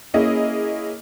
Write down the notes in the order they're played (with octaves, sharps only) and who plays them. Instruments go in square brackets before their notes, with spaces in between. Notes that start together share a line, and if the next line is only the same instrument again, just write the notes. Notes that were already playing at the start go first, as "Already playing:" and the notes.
[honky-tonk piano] A#3 C#4 E4 G#4 D#5